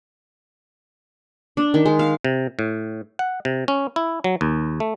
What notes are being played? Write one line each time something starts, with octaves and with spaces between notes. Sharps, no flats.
D4
D#3
G#3
F5
C3
A2
F#5
C3
C#4
E4
F#3
D#2
A3